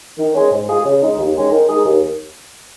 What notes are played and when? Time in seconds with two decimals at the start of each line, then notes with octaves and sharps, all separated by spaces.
0.18 D#3
0.35 G#3 C#4
0.52 G#2
0.68 G#3 F4 G#4
0.85 C#3
1.02 G#3 D#4
1.18 D#2
1.35 D#3 G#3 C#4
1.52 D#3
1.69 G#3 D#4 G#4
1.85 D#2